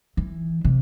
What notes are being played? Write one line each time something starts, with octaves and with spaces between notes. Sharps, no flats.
E3
C3